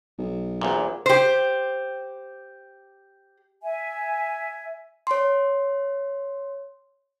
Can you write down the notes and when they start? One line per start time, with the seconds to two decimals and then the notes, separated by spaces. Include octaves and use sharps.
0.19 B1
0.61 A#1 E2 A#2
1.06 G4 C5
3.63 E5 G#5
5.07 C#5 C6